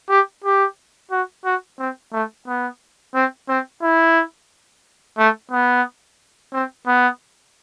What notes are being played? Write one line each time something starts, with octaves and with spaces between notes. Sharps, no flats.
G4
G4
F#4
F#4
C4
A3
B3
C4
C4
E4
A3
B3
C4
B3